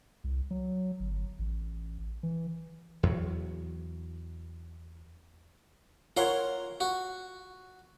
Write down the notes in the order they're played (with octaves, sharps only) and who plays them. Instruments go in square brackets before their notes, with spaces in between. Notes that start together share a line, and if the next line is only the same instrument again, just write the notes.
[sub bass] C2
F#3
G1
A1
E3
[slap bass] E2 F#3
[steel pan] F4 C#5 [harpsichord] A#4 F#5 C6
[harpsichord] F#4